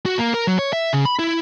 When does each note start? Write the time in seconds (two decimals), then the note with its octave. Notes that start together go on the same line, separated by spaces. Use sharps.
0.06 F#4
0.19 A#3
0.34 A#4
0.47 F#3
0.59 C#5
0.73 E5
0.93 C#3
1.05 B5
1.19 E4